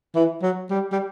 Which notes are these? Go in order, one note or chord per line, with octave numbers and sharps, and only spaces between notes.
E3
F#3
G3
G3